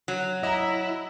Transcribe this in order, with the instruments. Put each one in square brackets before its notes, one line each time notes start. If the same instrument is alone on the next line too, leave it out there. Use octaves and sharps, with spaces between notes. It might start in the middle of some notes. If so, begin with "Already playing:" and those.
[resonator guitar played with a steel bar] F#3
[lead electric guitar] E4 [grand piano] D#5 A#5